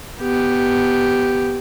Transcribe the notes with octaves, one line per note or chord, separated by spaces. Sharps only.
B3 G4